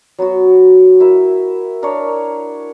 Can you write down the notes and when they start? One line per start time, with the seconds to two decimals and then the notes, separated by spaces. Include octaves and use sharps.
0.18 F#3 B3 F#4
1.00 E4 A#4 E5
1.83 D4 A#4 C#5